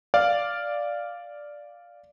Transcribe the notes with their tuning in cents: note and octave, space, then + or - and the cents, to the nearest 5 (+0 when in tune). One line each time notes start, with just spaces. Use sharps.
D5 +0 F5 +0